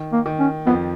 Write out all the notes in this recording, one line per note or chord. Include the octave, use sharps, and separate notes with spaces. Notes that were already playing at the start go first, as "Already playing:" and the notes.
Already playing: D#3
A#3
D#3
C#4
F2 F3 B3